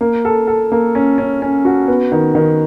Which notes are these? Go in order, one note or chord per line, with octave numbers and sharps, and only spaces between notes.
A#3
A4
A4
A#3
C#4
C#4
C#4
F#4
B3
D#3
D#3